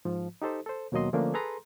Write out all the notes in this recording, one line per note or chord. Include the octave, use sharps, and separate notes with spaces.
G#2 F3
D#4 G4 A4 C5
A4 C5
D#2 B2 F#3 A#3 D#5 C6
D3 F3 A3 A#3 C#4 D4
G#4 A4 B4 A#5 C6